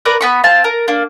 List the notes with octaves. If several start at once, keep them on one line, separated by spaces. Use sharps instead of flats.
A#4 B4 D5 A#5
B3 B5 C#6
C4 F4 A5
A#4
A#3 D4